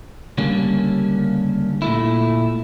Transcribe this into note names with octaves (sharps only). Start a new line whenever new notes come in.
C#2 D3 G3 A#3 C#4
A#2 A3 E4